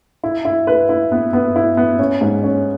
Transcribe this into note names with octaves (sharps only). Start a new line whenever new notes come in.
E4
E4
B4
E4
B3
B3
E4
B3
C#4
G#2
C#4